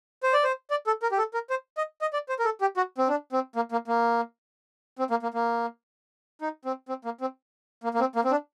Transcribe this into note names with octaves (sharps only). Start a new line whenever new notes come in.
C5
D5
C5
D5
A4
A#4
G4
A4
A#4
C5
D#5
D#5
D5
C5
A#4
A4
G4
F#4
C4
D4
C4
A#3
A#3
A#3
C4
A#3
A#3
A#3
D#4
C4
C4
A#3
C4
A#3
A#3
C4
A#3
C4
D4